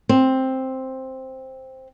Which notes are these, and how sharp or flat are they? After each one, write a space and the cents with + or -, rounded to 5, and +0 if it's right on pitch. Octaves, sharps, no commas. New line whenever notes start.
C4 +5